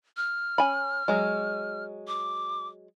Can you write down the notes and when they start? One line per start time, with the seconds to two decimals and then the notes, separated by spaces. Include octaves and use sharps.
0.17 F6
0.58 C#4 G#5 B5
1.08 F#3 G#3
2.08 D6